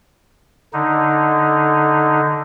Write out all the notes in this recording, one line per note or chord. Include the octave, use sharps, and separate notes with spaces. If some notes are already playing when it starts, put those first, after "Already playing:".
D3 D#4